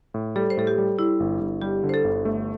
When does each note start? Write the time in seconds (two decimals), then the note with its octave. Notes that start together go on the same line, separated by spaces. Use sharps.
0.14 A2
0.36 G3 A4
0.50 C5
0.57 A2 A4
0.67 G4
0.78 G3
0.99 G3 E4
1.20 G1
1.41 G1
1.62 G3 G4
1.84 D3
1.89 C5
1.94 A4
2.04 G1
2.25 A3